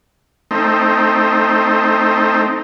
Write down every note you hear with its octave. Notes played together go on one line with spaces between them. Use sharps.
A3 C4 D#4